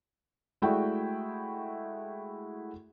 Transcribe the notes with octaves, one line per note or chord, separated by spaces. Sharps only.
G#3 A3 E4 F#4 D5 G5